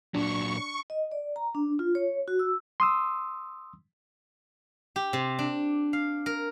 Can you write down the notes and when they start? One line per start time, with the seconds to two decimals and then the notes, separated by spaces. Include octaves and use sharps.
0.14 A#2 F#3 D4 C#6
0.90 D#5
1.12 D5
1.36 A#5
1.55 D4
1.79 F4
1.95 C#5
2.28 F#4
2.39 E6
2.80 C6 D#6 E6
4.96 G4
5.13 C3
5.39 D4
5.93 F5
6.26 A#4